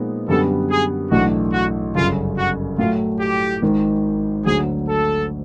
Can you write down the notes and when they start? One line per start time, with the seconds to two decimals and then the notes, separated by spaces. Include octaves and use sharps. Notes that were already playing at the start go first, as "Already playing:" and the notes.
Already playing: A#2 F3 G#3 B3 D#4
0.28 F#2 D3 G3 B3 A4
0.70 G#4
1.11 B1 A2 E3 A3 D4 F#4
1.53 F#4
1.95 G1 F#2 C#3 F4
2.37 F#4
2.78 A2 F#3 A3 F4
3.20 G4
3.62 G#1 G#2 D#3
4.45 D2 D3 F#3 G#4
4.88 A4